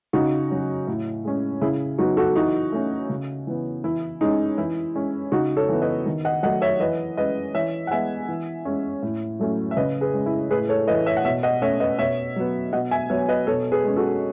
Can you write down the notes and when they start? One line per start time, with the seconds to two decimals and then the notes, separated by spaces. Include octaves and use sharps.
0.13 C#3 D#4 F#4
0.50 F#3 C#4
0.87 A2
1.24 G#3 C#4
1.61 C#3 E4 G#4
1.98 F#3 B3 D#4 F#4
2.17 F#4 A4
2.36 E3 D#4 F#4
2.72 A3 C#4
3.10 C#3
3.47 E3 B3
3.84 E3 E4
4.21 G#3 C#4 D#4
4.58 E3 E4
4.95 G#3 C#4
5.32 C#3 D#4 F#4
5.57 A4 C#5
5.69 E3 B3
5.82 B4 D#5
6.06 D#3
6.25 D#5 F#5
6.43 F#3 A3 D#5 F#5
6.62 C#5 E5
6.80 E3 B4 D#5
7.17 G#3 C#4 B4 D#5
7.54 E3 C#5 E5
7.87 F#5
7.91 G#3 B3 E5 G#5
8.28 E3
8.65 G#3 C#4
9.03 A2
9.40 F#3 A3 C#4
9.71 E5
9.77 C#3 B4 D#5
10.01 G#4 B4
10.13 G#3 C#4
10.26 E4
10.51 A2 G#4 B4
10.69 A4 C#5
10.87 E3 A3 B4 D#5
11.06 C#5 E5
11.17 F#5
11.24 B2 C#5 E5
11.43 D#5 F#5
11.62 A3 C#4 C#5 E5
11.80 B4 D#5
11.99 B2 C#5 E5
12.36 F#3 B3
12.73 B2 D#5 F#5
12.91 E5 G#5
13.10 F#3 B3 C#5 E5
13.28 B4 D#5
13.47 B2 A4 C#5
13.72 G#4 B4
13.84 G#3 C#4
13.96 F#4 A4